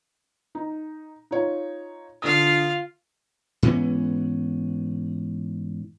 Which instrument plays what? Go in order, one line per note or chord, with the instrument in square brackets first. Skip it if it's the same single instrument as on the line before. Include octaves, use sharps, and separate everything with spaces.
[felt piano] D#4
D#4 F4 C#5
[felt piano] D3 D#6 [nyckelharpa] F4 F5
[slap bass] G#2 E3 B3 C#4